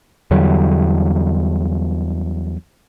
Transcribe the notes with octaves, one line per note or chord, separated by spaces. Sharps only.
E2 D3 F#3 G3